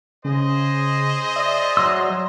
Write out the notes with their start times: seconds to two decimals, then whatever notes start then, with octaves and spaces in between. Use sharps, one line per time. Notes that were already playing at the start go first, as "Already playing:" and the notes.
0.25 C#3 G#4 C5 D#5
1.36 D5 E5
1.77 F#3 C6 E6